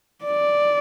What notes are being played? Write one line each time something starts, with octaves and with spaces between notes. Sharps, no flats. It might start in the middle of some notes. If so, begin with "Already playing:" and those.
D5